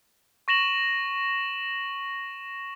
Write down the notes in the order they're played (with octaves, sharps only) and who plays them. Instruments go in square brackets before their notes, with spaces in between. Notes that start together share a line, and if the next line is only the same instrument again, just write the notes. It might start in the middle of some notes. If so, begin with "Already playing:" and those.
[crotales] C#6 A#6 E7 F#7